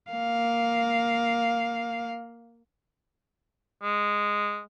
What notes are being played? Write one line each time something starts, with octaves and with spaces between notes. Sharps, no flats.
A#3 F5
G#3